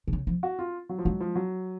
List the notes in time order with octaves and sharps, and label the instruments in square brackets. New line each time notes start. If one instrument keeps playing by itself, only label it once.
[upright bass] C3
C#3
F3
[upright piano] F#4
F4
F#3
F3
[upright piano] F#3 [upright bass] G#3
[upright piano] F3
F#3